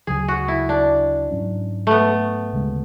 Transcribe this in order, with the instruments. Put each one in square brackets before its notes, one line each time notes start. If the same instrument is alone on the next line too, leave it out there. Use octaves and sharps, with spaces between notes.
[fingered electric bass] D2 C#3 F#3 [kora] G#4
[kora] F#4
E4
D4
[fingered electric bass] G#2 F#3 C#4
[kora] A3 B3
[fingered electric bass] D2 C#3 G#3